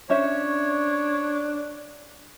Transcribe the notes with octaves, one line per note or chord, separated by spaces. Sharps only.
C#4 D4 C5 C#5 E5